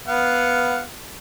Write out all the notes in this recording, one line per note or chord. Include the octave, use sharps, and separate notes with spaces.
B3 F5 F#5